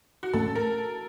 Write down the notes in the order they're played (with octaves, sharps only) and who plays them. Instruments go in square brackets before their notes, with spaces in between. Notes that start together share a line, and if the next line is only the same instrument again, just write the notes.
[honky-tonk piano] F#4
[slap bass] A2 A3 C#4 [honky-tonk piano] A4
[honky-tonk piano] A#4